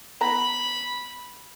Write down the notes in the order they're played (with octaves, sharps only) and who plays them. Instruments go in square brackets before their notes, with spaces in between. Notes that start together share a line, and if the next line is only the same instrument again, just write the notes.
[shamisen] B3 E4 A#5 [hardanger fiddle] B5